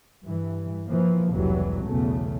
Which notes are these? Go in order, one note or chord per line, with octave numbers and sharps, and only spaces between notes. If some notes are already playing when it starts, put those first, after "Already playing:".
G2 E3
E3 F3 A#3
F1 C#2 E3 F#3 G3
B1 E2 C#3 A3